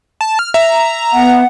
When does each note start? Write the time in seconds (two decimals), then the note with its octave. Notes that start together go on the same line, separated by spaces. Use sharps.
0.21 A5
0.39 F6
0.54 E5 A#5
1.13 B3 F#5